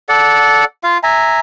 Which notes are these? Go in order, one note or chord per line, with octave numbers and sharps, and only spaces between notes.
A4 D5 F#5
F4 F5
E5 G#5 A#5